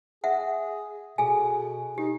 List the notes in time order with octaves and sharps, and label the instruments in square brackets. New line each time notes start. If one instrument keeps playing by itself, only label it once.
[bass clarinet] G#4 [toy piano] E5 F#5
[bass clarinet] B2 [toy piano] G#4 A4 G#5
[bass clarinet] D#4 [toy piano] G4